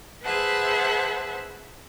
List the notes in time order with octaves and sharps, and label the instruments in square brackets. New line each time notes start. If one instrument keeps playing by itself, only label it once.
[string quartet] G#4 B4 C5 E5 F#5 A5